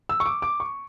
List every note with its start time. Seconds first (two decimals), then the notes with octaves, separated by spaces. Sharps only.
0.09 E6
0.20 C#6
0.26 D6
0.42 D6
0.60 C#6